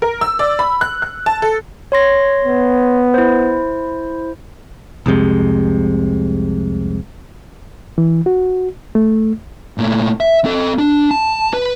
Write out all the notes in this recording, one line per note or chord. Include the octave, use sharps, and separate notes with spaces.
A#4
E6
D5
B5
F#6
F#6
A5
A4
C#5 C6 A#6
B3
E4 C5
C2 F2 C3 G#3
E3
F#4
A3
A#2 A3
E5
C4 A4
D4
A5
B4